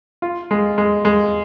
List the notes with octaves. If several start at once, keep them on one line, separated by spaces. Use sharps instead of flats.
F4
G#3
G#3
G#3